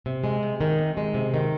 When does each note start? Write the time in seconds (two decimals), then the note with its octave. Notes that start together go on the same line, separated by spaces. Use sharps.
0.06 C3
0.24 G#3
0.43 C3
0.61 D#3
0.78 C3
0.97 G#3
1.14 C3
1.34 D#3